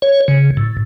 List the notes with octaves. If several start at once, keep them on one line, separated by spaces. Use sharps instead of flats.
C#5
C#3
A2